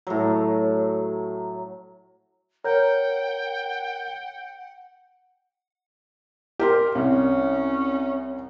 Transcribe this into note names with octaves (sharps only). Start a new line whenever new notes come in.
A2 F#3
A#4 C#5 F#5 G5 G6
G4 A#4 C6
C2 C#4